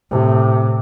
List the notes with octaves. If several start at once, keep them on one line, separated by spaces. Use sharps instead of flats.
A2 C3